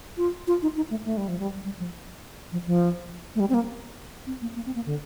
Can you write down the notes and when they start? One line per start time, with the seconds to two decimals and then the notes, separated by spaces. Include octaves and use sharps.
0.17 F4
0.47 F4
0.62 D#4
0.76 D#4
0.90 A3
1.05 A3
1.17 G3
1.28 F3
1.39 G3
1.65 G3
1.79 F3
2.52 F3
2.66 F3
3.35 A3
3.40 G3
3.49 C4
3.54 A#3
4.27 C4
4.42 A#3
4.56 A#3
4.66 C4
4.75 A#3
4.86 D3